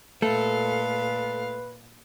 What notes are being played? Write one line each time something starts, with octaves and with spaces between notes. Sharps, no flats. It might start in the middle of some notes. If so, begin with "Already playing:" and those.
A#2 A3 A4 B4 F5